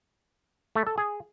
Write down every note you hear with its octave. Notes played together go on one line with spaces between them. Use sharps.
A3
A4
G#4